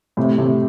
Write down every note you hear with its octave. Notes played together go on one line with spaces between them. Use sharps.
A2 C3
A2 C3